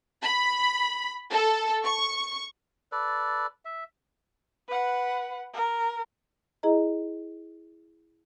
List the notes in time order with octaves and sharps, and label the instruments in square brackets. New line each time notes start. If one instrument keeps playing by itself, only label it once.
[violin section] B5
A4
C#6
[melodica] A4 B4 D5
E5
[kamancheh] B4 F#5
A#4
[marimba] E4 G#4 D#5 A#5